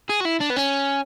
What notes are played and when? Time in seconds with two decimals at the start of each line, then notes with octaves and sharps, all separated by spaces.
0.09 G#4
0.20 F#4
0.25 E4
0.40 D4
0.50 B3
0.56 C#4